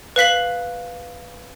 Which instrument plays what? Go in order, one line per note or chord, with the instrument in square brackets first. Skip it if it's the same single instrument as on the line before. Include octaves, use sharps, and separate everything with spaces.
[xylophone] B4 F5 B6 F#7